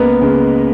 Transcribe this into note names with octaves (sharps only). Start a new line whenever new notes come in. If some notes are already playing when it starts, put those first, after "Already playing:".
Already playing: C#2 C#3 G#3 A#3 B3 A#4 B4
C#3 G#3